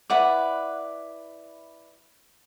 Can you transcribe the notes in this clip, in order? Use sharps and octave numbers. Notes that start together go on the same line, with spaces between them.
E4 B4 D5 F#5